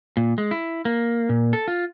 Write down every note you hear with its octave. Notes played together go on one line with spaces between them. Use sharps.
A#2
G#3
E4
A#3
A#2
A4
F4